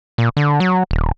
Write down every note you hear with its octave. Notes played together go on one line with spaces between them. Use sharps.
A#2
D3
F#3
D#1